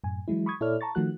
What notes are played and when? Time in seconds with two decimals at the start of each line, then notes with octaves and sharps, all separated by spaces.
0.04 F#2 A2 G#5
0.28 E3 F#3 G#3 E4
0.46 B5 C#6 D#6 G#6
0.61 A#2 E4 A4 C#5 D5 F6
0.81 A5 A#5 C#6 A6
0.95 D#3 F3 A3 F#4 F#6